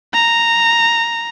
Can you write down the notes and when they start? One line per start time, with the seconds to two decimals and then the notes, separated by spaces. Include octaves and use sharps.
0.13 A#5